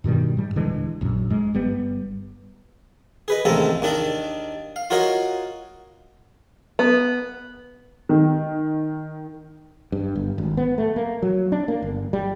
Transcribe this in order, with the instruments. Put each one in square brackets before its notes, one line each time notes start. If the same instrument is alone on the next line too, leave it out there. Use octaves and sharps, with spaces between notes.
[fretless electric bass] G2 B2 D#3 G3
G#2 G3
D#1 D3 E3 G#3
A#1 F#2
G#2 G#3
G1 G3 B3
[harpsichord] G#4 B4 D#5
A1 D#2 C3 G#3 A4 A#5
D#2 D#3 D4 D5 D#5
F5
F4 F#4 A#4 C#5 D#5 F5
[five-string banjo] B3
[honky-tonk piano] D#3
[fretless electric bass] G2
G1
G#1
B3
A3
A#3
F#3
D4
A#3
G1
G3